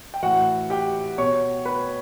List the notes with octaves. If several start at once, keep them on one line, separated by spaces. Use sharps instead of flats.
G5
A2 E3 F#4 F#5
G4 G5
B2 C#5 C#6
B4 B5